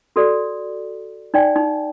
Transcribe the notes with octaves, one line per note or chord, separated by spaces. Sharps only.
F#4 A4 D5
D#4 D5 G5 G#5
D#4